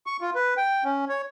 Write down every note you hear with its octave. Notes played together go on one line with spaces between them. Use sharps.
C#6
F4
B4
G5
C#4
C#5